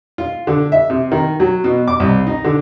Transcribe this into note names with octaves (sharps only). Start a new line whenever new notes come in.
F4
D3
E5
C3
D#3
F#3
B2
D6
C2
D#4
D3